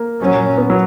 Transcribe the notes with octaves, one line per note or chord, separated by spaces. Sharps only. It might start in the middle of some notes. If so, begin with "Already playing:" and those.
Already playing: A#3
A#2 F#3 C#4
B3
F#3